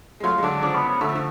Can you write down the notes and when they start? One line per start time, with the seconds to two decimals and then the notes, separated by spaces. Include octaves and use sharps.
0.20 G#3
0.24 F#3 A3 F4
0.38 G#3
0.43 D3 F#3 D4
0.62 C#3 F3 D4
0.75 B3
0.88 B3
1.01 D3 A3
1.09 F3
1.15 D3